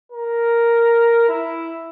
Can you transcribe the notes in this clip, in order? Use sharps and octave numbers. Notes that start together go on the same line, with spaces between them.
A#4
E4